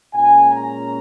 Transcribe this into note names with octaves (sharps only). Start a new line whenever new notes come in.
A#2 G#3 C#4 G#5
A#5